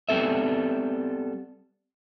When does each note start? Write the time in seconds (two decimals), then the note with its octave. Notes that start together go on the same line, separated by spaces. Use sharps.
0.09 G3 B3 C4 A4 E5